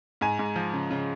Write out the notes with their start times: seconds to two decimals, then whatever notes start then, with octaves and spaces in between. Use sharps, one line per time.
0.21 G#2 G#5
0.39 G#2
0.56 F3
0.73 C#3
0.91 C#3